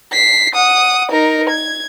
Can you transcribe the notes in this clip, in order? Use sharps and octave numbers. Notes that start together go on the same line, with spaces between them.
B6 C7
F#5 D#6
D#4 A#4
G#6